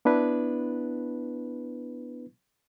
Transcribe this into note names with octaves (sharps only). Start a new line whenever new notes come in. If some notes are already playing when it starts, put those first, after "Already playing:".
B3 D4 E4 B4